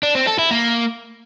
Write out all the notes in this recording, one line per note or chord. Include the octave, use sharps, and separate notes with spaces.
D4
C4
A4
E4
A#3